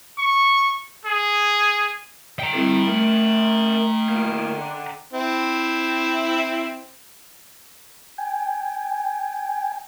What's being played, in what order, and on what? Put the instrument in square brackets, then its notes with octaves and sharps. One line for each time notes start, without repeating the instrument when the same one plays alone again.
[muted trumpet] C#6
G#4
[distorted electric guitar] G5 A#5
[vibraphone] G3 C4 [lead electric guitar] E4 A4
[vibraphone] A3 [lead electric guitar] A#4 E5
[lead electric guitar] A2 A#3
D3
[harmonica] C4 E4
[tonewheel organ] G5 G#5